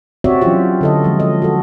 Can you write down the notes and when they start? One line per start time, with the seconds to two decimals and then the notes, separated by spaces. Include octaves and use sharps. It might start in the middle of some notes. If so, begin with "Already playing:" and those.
0.24 C4 F#4 G4 C#5 D5 E5
0.41 E3 F#3 C#4 D4 F4 G4
0.81 D3 A4 D#5
1.04 F3 G#3
1.20 D#5
1.42 F#4 A4